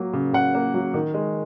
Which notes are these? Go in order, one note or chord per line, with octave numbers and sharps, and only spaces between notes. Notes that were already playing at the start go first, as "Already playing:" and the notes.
Already playing: F#3 A#3
C#3
C#3 F#5
A#3
F#3
D#3
G#3